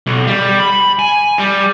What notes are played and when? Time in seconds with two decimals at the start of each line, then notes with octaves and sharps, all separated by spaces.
0.06 B1
0.27 G3
0.60 B5
0.99 G#5
1.39 G3